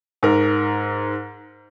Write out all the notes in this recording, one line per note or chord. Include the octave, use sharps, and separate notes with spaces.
G#2 A#4